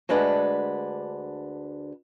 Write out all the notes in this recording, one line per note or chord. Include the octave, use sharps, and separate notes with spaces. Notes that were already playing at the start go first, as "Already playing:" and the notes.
D2 G#3 D4 B4 F#5